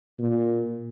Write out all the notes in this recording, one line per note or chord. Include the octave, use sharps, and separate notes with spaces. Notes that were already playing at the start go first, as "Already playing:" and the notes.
A#2